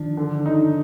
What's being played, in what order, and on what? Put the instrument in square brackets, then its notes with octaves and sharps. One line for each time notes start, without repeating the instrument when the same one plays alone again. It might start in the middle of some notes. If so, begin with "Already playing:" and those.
Already playing: [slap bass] D#3 F3 [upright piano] D4
[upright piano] D3
D#4